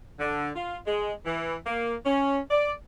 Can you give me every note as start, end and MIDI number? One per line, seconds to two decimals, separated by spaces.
0.19 0.50 50
0.55 0.77 65
0.87 1.12 56
1.26 1.55 52
1.66 1.94 58
2.05 2.39 61
2.50 2.72 74